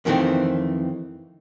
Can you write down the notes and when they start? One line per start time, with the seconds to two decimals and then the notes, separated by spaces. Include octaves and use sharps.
0.05 F2 D#3 E3 G3 A3 C4